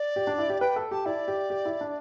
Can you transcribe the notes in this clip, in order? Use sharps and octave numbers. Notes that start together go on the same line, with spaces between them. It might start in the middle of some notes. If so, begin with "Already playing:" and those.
Already playing: D5
G4
D4
E4
G4
B4 G5
A4
G4 A5
E4 D5
G4
G4
E4
D4